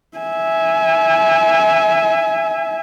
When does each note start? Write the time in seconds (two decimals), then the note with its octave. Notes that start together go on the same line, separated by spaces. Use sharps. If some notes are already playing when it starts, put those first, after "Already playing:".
0.18 E5 G#5